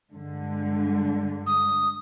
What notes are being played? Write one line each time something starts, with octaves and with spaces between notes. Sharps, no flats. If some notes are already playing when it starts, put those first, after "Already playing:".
G2 D3 G#3
D#6